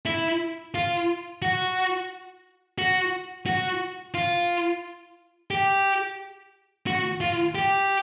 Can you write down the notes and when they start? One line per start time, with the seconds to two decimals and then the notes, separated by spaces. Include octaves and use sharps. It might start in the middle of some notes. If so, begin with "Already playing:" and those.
0.06 E4
0.75 F4
1.42 F#4
2.78 F#4
3.46 F#4
4.14 F4
5.51 G4
6.87 F#4
7.21 F4
7.55 G4